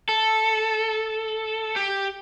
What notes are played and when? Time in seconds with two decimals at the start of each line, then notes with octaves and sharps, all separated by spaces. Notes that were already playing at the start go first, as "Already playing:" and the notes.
0.09 A4
1.76 G4